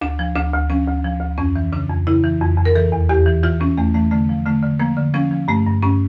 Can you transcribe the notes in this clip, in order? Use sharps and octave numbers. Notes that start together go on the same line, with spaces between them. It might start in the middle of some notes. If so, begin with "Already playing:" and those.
D2 D4
F3
D2 D4
D2
F3 C#4
D2
F3
D2
F2 C#4
E3
C#3 D4
F2
C#3 E4
E3
F2
F2
A#4
E3 A4
E2
E2 G4
E3
E3 F4
E3 C#4
E2 A3
E3 A3
D3 A3
F3
D3 A3
D3
F3 A#3
D3
F3 C#4
F3
G2 A3
G2
G2 C#4